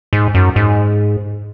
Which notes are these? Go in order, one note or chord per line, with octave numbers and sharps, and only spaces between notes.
G#2
F#2
G#2